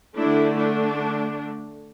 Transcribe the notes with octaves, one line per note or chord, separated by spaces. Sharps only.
D3 A3 D4 E4
D4